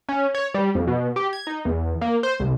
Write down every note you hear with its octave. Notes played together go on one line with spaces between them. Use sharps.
C#4
C#5
G3
F2
B2
G4
G#6
D#4
E2
A#3
C5
C2